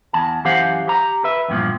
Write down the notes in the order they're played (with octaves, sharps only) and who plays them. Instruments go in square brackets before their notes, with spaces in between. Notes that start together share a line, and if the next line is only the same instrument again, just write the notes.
[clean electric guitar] E2 A5
F#2 E3 G4 C5 F5 F#5
G4 A#5
B4 E5
E2 G2 A#2 F3